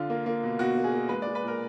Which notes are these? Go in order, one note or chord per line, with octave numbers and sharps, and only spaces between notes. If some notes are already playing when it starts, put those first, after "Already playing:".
Already playing: D3 F4
A#3
A#3
B2
B2 F#4
A#3
G#4
A#3
G#3 B4
G#3 D5
B4
A#2 A#4